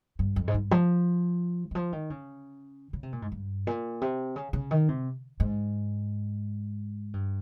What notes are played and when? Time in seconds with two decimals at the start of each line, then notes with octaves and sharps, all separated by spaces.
0.19 G2
0.36 F2
0.48 G#2
0.54 G2
0.71 F3
1.71 D#3
1.75 F3
1.92 D#3
2.10 C#3
2.93 C#3
3.03 C3
3.12 A#2
3.22 G#2
3.32 G2
3.67 A#2
4.01 C3
4.36 C#3
4.53 C#3
4.71 D#3
4.88 C3
5.40 G#2
7.13 G2